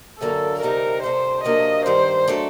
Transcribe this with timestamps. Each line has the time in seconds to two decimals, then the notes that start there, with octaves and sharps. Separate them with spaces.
0.20 F#2 D3 F#3 A#3 D4 A4
0.62 D2 C3 G3 C4 D#4 A#4
1.03 C3 G3 D4 A4 C5
1.44 C3 F#3 A#3 D4 A4 D#5
1.86 G2 D#3 G3 C5
2.28 F#3 A3 D4 A4